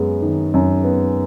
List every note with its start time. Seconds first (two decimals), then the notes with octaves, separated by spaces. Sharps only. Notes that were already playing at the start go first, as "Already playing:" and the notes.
Already playing: F#2 G#3 B3
0.22 D#3
0.54 F#2
0.84 B3